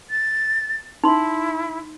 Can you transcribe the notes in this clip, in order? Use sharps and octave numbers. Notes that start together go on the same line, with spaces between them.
A6
D#4 E4 C6